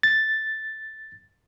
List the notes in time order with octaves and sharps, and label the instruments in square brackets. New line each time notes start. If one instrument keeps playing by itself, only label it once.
[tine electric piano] A6